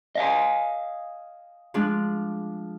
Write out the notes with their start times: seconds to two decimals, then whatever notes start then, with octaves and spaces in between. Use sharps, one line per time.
0.15 D#5 F5 G#5
1.74 F3 G#3 D4